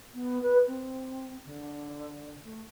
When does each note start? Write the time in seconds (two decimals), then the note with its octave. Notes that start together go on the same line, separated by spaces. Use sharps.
0.13 B3
0.42 B4
0.66 C4
1.45 D3
2.43 A3